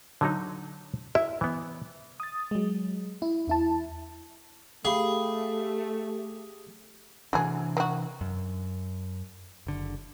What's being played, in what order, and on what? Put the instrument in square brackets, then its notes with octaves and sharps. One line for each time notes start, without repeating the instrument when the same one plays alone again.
[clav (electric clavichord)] D3 F#3 D#4
[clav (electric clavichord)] E4 [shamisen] E5
[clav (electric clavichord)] E3 B3
[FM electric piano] D#6 A6
F#3 G#3
E4
E2 E4 A5
[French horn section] A3 [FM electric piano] G4 [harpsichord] G#4 [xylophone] E5 F5 B5
[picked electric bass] C3 E3 D4 [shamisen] A3 F#4 G#4
[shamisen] D#3 F#4
[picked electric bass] F#2
F#1 D3